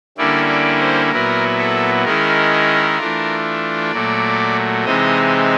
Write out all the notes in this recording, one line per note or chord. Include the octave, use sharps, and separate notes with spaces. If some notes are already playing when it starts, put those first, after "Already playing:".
D3 G3 A#3 C#4 E4 D5
D5
C5
A#2 F#3 B3 E4 A#4
A4
D#3 G#3 C#4 E4 A#4
E3 A3 D4 F4
A#2 F#3 A3 D5
C3 E3 G#3 C4 D#4 D#5